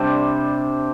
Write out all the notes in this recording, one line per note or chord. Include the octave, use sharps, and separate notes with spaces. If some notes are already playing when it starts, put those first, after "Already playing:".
Already playing: C3 G3 D4 C5